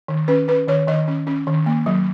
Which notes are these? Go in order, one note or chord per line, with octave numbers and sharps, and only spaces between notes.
D#3
C#4 B4
C#4 B4
D#3 C#5
D#3 D#5
C#4
C#4
D#3
A#3
F#3